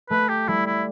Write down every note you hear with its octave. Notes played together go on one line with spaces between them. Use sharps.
A3 B4
G4
G3 E4
E4